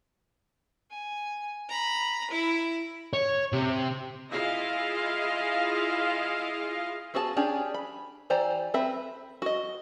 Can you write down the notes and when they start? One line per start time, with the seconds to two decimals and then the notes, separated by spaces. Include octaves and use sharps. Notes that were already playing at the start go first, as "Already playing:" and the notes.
0.91 G#5
1.69 A#5 B5
2.31 E4
3.13 C#5
3.53 C3
4.31 E4 F4 G#4 D#5 F5
7.14 B3 F#4 G#4 D#5 A5
7.37 C#4 D4 G4 G#4
7.74 B5
8.30 E3 G4 C5 D5 A#5
8.74 C4 B4 E5 B5
9.42 F#4 D#5